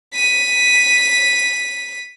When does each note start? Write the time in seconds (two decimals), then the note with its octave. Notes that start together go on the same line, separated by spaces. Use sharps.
0.14 B6 D#7